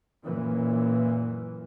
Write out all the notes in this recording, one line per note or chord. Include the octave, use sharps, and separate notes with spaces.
F#2 A#2 E3